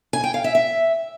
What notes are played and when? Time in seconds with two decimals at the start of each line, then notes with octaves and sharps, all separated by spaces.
0.13 G#5
0.24 G5
0.34 F5
0.44 E5
0.55 E5